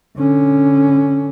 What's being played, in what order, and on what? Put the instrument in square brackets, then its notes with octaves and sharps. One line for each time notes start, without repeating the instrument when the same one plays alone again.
[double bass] D3 C#4